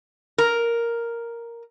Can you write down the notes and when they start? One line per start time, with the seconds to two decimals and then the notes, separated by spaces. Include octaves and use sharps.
0.38 A#4